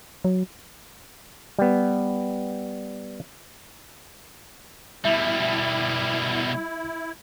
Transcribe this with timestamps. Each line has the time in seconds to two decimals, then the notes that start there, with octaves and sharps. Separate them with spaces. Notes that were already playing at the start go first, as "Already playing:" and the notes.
0.25 F#3
1.58 G3 B3
5.05 B2 G3 E4 E5